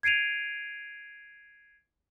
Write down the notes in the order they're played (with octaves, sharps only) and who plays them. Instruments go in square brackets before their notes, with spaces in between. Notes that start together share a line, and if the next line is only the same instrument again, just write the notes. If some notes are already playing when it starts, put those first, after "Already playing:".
[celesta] G#6 C7 D7 D#7 F7